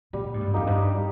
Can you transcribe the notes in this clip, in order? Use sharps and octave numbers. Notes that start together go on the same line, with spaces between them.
A#2 G3
G#2
G2
F2 A#3 D#4 G4
G2
G3